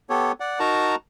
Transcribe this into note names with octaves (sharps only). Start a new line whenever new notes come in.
B3 G4 A4 C#5
D5 F#5
D#4 F#4 A#4 A5 A#5